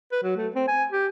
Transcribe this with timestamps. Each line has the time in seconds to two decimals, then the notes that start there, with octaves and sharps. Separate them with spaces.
0.12 B4
0.23 F#3
0.36 A3
0.55 C4
0.68 G#5
0.91 G4